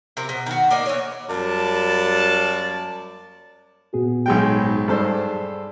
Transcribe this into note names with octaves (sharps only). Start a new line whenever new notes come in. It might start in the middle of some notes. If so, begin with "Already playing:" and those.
C3 F3 A#4
B2
D#3 F#4
A#3 D4 D#4
E3 C#5
F#2 G3 A#3 D5 A5
A#2 B3 F#4 G#4
B1 G#2 G#3 G5
G2 G#4 A4 C5 D5